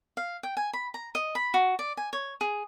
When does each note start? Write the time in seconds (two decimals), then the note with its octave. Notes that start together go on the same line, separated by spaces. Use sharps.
0.17 F5
0.43 G5
0.57 G#5
0.73 B5
0.94 A#5
1.15 D#5
1.35 B5
1.54 F#4
1.79 D5
1.97 G#5
2.13 C#5
2.41 G#4